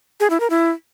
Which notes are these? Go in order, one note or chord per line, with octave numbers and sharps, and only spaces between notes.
G#4
E4
A#4
E4